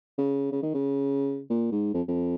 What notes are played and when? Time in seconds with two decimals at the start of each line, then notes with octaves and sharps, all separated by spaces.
0.18 C#3
0.52 C#3
0.62 D#3
0.74 C#3
1.50 A#2
1.72 G#2
1.94 F2
2.08 F2